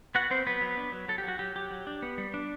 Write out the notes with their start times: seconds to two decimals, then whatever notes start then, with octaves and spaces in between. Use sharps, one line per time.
0.15 B3 F#4 F#5
0.30 B3 C4 C5
0.47 F#3 B3 B4
0.61 F#3
0.78 D4
0.92 F#3
1.08 F#3 A4
1.18 G4
1.24 F#3 F#4
1.39 F#3 G4
1.55 F#3 G4
1.71 F#3
1.87 D4
2.02 B3
2.18 G3
2.34 D4